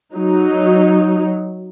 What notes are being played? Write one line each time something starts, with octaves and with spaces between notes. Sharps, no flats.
F#3 D#4